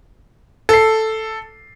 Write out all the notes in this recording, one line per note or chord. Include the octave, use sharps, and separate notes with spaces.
A4 C7